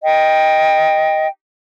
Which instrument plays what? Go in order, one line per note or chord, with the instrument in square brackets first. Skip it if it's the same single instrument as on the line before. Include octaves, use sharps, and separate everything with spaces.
[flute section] D#5 G5